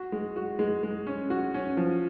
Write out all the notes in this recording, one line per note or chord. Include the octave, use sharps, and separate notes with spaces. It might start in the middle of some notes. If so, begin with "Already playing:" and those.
Already playing: F#4
G#3
F#4
G#3
G#3
C#4
F#4
C#4
F3